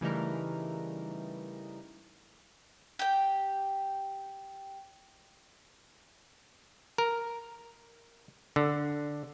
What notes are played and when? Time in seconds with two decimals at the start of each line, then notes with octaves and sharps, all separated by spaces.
0.01 C#3 E3 G3 A3 D#4 A#4
2.99 G4 G5
6.98 A#4
8.56 D3